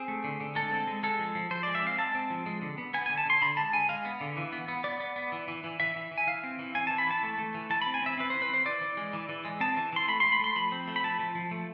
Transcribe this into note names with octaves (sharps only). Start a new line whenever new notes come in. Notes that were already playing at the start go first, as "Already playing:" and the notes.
Already playing: C4 G#4
A3
D3
D3
G#3 A4
C4
G#3
G#3 A4
F3
F3
F3 C5
G#3 D5
E5
C4 F5
G#3 A5
C4
F3
G#3
D3
B3
B3 G#5
D3 G#5
A5
D3 C6
D3 B5
G#3 A5
D3 G#5
G#3 F5
B3
D3
E3
B3
B3
B3 D5
B3
B3
E3
E3
E3
E3 E5
E3
E3
G#5
E3 F5
C4
E3
C4 G#5
E3 A5
B5
E3 A5
A3
A3
E3
E3 A5
C4 B5
G#5
C4 E5
C4 B4
E3 C5
B4
C4 C5
E3 D5
E3
G#3
E3
E3
G#3
C4 A5
E3
E3 C6
A3 B5
A3 C6
B5
A3 C6
F3 B5
C4
A3
B5
F3 A5
F3
F3
A3